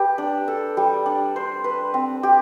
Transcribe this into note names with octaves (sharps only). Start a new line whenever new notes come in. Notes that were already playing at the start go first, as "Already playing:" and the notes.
Already playing: G4 B4
D4
A4
G3
D4
C5
B4
C4
G4